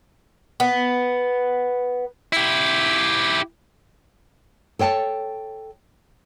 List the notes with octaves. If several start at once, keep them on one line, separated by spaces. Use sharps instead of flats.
B3
E4 G4
A4 C#5 G5 A5